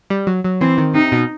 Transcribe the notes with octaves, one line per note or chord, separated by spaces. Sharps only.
G3
F#3
F#3
E3 C4
D#3
C3 D#4
B2